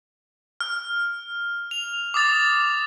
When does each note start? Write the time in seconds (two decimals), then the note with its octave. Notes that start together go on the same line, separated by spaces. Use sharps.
0.60 F6
1.71 F7
2.14 D6 D#6 A6